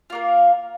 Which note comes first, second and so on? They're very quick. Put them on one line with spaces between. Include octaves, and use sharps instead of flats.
F4 A#3 A#4